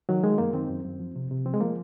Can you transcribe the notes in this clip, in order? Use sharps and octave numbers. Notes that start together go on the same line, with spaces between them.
D#3 F#3
D#3 G#3
F#2 A#3
D#3 C4
F#2
F#2
F3
C3
C3
F3 C4
G#3
F3 A#3